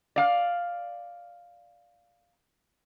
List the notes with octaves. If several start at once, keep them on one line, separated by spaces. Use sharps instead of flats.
D5 F5